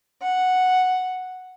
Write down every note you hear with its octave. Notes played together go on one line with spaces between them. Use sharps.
F#5